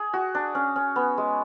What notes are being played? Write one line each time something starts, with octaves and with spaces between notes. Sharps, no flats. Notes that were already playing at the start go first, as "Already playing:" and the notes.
Already playing: G#4
F#4
D4
C#4
C#4
B3
G#3